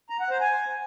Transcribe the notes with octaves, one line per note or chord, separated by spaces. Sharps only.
A#5
F#5
C5
G#5